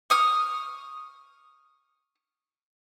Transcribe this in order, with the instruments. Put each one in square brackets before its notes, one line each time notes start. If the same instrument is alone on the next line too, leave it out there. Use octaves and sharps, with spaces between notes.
[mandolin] C#6 D#6 F6